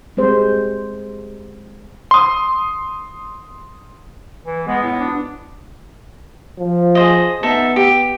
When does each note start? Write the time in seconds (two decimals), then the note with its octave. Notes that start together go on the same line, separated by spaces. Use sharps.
0.17 G3 G#3 C4 C5
2.11 C6 D#6
4.45 E3
4.67 G#3 B3
4.83 A2
5.00 D4
6.59 F3
6.95 G#4 C5 D#5
7.43 B3 D#4 A4 E5
7.76 G4